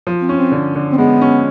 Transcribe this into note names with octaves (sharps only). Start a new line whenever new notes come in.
F3
C4
C#4
C4
D3
D3
C4
G#3 B3
C#4